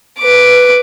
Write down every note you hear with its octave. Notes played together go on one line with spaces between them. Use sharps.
B4 D6